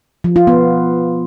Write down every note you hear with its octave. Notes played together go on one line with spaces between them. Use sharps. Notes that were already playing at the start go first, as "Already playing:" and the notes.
F3
F4
B3